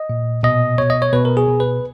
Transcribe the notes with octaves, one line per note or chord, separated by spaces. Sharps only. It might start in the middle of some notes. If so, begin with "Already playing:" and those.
Already playing: D#5
A#2
B2 D#5
B2 C#5
D#5
C#5
B2 B4
A#4
G#4
B2
B4